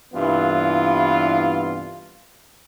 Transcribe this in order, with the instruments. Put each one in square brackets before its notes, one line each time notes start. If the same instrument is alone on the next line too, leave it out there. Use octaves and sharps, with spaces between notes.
[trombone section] C2 G2 E3 B3 F4